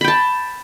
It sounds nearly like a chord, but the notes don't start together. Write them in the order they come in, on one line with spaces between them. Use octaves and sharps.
B5 G5 A5